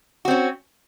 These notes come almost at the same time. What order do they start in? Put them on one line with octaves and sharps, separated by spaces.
F#4 C4 C#4